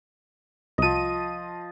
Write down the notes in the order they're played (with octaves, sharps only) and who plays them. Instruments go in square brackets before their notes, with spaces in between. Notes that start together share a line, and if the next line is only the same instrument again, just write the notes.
[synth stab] C2 D#7 [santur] F3 D#5